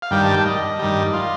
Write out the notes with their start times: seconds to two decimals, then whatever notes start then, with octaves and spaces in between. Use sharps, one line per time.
0.02 F5
0.11 G2 D#3 G3 G5
0.23 A5
0.34 G5
0.45 D#5
0.79 G2 D#3 G3
1.13 F4